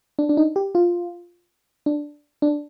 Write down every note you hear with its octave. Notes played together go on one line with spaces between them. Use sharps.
D4
D4
D#4
G4
F4
D4
D4